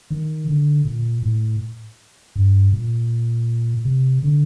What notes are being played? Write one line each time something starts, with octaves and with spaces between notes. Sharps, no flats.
D#3
D3
A#2
A2
G2
A#2
C3
D3